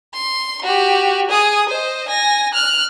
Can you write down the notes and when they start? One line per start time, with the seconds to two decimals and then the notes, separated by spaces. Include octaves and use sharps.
0.14 C6
0.63 F#4 G4
1.30 G#4 D#6
1.69 C5 D#5
2.08 G#5 A#6
2.53 F6 F#6